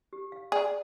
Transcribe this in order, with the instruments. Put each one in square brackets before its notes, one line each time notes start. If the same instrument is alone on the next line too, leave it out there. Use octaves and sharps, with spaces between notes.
[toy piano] G4
F5
[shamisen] G#4 [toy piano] D5